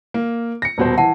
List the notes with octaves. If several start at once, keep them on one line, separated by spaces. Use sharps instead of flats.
A#3
A#6 C#7
D#1 B2 C5
E3 F#5 A5